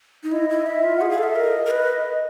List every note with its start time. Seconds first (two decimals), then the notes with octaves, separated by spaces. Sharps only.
0.23 D#4
0.32 E4 D#5
0.50 E4
0.66 E4 E5
0.84 F4
0.97 G#4 F#5
1.10 G#4 F5
1.18 A4 E5
1.36 A#4 E5
1.40 D#5
1.66 A#4
1.71 B4